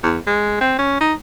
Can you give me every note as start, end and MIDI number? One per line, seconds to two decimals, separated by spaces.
0.03 0.18 40
0.27 0.59 56
0.61 0.75 60
0.79 0.99 61
1.01 1.14 63